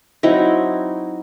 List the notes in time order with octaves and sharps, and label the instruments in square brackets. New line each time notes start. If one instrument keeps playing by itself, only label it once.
[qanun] F#3 C4 D#4 E4